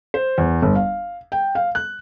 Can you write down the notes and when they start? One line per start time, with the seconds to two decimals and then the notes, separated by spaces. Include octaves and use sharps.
0.14 C5
0.38 E2
0.62 G1
0.75 F5
1.32 G5
1.55 F5
1.75 F#6